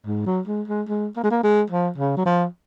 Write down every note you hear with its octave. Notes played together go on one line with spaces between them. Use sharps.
G#2
F#3
G#3
G#3
G#3
A#3
G#3
A#3
G#3
F3
C#3
F#3
F3